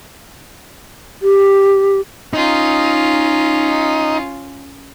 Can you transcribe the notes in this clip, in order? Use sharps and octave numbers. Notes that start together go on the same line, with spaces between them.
G4
C#4 D#4 F4